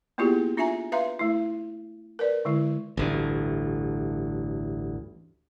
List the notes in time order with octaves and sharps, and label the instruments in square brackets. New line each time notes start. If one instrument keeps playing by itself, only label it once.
[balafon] A#3 B3 E4 F4 G4 G#4
D4 F4 E5 G#5 A#5
B4 E5 F5 A#5 C6
A3 E4
A#4 B4 D5
D3 G#3 E4
[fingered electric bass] A1 D2 G2